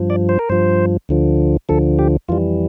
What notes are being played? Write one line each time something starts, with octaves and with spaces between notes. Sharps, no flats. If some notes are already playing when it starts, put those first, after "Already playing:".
Already playing: G2 F3
D5
C5
A#4
G2 F3 C5
D2 D3 F3
D2 D3 F3 A4
G4
F2 E3 G3 F4